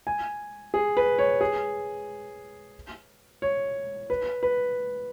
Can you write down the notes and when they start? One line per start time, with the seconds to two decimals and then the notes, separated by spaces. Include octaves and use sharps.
0.07 G#5
0.74 G#4
0.97 B4
1.19 C#5
1.41 G#4
3.42 C#5
4.10 B4
4.43 B4